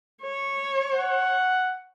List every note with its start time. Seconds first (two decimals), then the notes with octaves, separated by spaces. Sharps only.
0.22 C#5
0.95 F#5